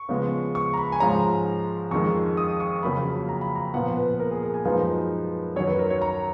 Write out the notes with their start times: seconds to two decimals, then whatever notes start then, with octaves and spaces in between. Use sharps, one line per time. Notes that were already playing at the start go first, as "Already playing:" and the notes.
Already playing: C#6
0.09 C#3 F3 G#3 B3
0.55 C#6
0.74 A#5
0.78 B5
0.92 G#5
1.00 G#2 F3 G#3 C#4 A#5
1.91 F2 D#3 G#3 C#6
2.37 D#6
2.60 C#6
2.83 F2 C#3 F#3 A#3 B5
3.29 A#5
3.41 B5
3.55 A#5
3.74 A#2 F3 B3 F#5
3.97 B4
4.20 A#4
4.31 G#4
4.43 A#4
4.54 G#5
4.65 F#2 F3 G#3 D#4 B4
5.56 F#2 D#3 F#3 C#5
5.68 B4
5.79 A#4
5.90 C#5
6.02 A#5